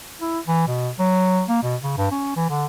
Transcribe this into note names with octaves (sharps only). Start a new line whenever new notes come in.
E4
E3
B2
F#3
A#3
B2
C#3
G2
C#4
E3
D3